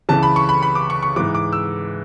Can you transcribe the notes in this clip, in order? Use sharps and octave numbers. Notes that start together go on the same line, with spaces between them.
C#2 C#3 E3 A5
B5
C#6
B5
B5
D6
C#6
C#6
G#2 E3 D6
D6
E6